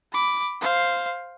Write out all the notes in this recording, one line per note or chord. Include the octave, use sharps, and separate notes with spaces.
B5 D6
C5 F5